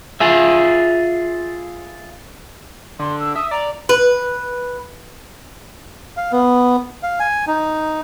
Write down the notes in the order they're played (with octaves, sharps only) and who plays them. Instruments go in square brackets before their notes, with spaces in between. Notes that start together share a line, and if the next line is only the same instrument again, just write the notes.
[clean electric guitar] F4 G#4 E5
[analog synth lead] D3 [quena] C6
[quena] E6
[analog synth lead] E5 [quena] D#6
[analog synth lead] D5 [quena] A#5
[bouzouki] B4
[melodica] F5
B3
F5
G#5
D#4